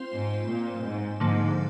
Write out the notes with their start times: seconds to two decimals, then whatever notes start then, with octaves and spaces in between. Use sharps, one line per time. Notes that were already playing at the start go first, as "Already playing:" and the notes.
Already playing: C4 F4 C5
0.14 G#2
0.49 A#2
0.85 G#2
1.20 G#2 D3 F3 A#3